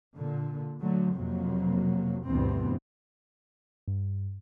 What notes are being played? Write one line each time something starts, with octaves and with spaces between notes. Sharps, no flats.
A#2 D3
D3 F#3 A3
F2 C3 F#3 A#3
D2 G2 B2 E3 B3 C4
G2